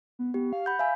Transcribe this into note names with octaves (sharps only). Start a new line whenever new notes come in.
B3
B3 G4
F5
F#5 B5 G6
E5 F5 G#5